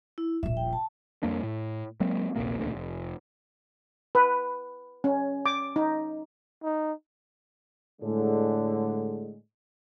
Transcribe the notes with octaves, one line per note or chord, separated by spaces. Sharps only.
E4
D#1 A#1 E5
G5
A5
F2 G3 A#3 D4
A2
F#3 G#3 A#3 C4
D#1 A#1 C3 A#3
E1 D2 A#2 D3
F1
B4
C#4
D6
D#4
D#4
A2 D3 G#3